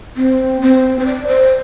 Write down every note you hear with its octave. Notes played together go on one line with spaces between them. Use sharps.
C4
C4
C5
D5
C5